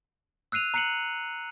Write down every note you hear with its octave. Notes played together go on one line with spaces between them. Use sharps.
E6 F#6 C7 D#7 F7
A#5 F#6 C7 C#7 D#7 F#7